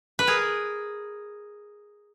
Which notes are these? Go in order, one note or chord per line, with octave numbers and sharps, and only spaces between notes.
B4
G#4 A#4